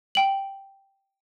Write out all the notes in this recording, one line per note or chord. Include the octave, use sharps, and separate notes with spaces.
G5 F#7